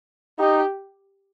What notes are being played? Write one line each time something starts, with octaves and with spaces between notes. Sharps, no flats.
D#4 G4